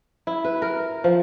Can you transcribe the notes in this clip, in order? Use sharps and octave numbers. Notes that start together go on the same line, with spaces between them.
E4
B4
A#4
F3